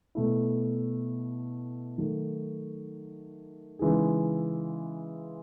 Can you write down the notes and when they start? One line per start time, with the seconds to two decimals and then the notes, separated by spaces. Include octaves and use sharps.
0.15 B2 A3 E4
1.98 D#3 F#3 A3
3.79 C#3 E3 G#3 D#4 G#4